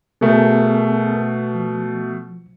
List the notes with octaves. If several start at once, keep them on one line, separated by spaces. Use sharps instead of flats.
B2 A3 B3 G#4 A#4
F3